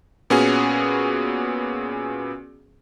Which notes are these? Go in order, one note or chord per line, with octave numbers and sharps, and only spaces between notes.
A#2 B3 C#4 F#4 G#4